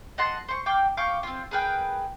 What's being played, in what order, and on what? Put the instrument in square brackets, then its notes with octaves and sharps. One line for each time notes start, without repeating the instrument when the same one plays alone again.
[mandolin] D#5 F#5 A5 C6
C5 C#6
F5 G5 D6
F5 G5 C#6 D6
C4 F4
G#4 A#4 B4 G5